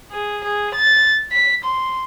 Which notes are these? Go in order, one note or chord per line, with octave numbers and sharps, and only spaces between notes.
G#4
G#4
A6
B6
C6